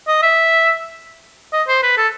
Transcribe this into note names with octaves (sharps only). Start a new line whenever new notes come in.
D#5
E5
D#5
C5
B4
A4